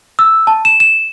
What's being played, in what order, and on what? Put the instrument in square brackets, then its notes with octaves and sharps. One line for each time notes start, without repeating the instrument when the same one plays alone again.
[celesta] E6
A5
E7
E7